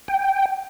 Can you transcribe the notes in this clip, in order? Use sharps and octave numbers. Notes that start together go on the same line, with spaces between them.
G5